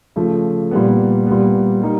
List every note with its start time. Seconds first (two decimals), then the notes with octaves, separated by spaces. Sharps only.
0.16 C#3 F3 A3
0.71 A#2 G3 B3
1.27 A#2 G3 B3
1.81 G3 A#3 D#4